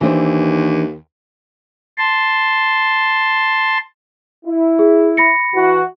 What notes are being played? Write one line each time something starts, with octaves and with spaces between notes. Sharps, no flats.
D#2 E3 D4 C5
A5 C6
E4
G#4
B5 A#6 C#7
E3 F#4